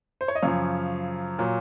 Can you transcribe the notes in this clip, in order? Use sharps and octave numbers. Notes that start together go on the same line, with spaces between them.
C5
C#5
D#5
F#2 C#3 F3 C#5 F5
A#2 F#3